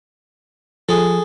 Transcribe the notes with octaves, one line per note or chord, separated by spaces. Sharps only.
F3 G#4 A4